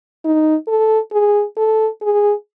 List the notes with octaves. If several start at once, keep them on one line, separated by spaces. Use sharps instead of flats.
D#4
A4
G#4
A4
G#4